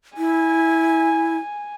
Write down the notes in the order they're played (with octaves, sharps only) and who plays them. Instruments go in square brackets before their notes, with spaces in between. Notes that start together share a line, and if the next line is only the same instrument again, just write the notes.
[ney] E4 [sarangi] G#5